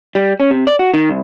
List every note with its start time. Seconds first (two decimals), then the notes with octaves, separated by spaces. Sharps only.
0.15 G3
0.40 C#4
0.51 C3
0.67 D5
0.79 F#4
0.94 D#3
1.09 C2